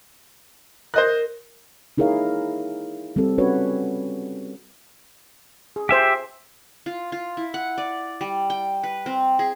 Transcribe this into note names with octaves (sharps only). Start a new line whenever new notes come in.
A#4 C5 D#5 F#6
D#4 E4 G#4 A#4 C#5 F5
G3 C4 G4 A4
C#4 F#4 B4 C#5
G#4
G4 C5 E5 G#5
F4
F4
E4
F#5
D5
G3
G5
B4
C4
G#4